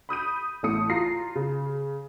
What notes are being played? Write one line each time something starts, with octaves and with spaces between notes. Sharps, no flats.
B5 D#6 G6 D#7
A1 A3 D#6 C#7
F4 A#5 A#6 C7
C#3